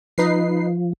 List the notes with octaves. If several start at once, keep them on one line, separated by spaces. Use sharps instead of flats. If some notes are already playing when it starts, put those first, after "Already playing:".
F3 D#4 B4 C7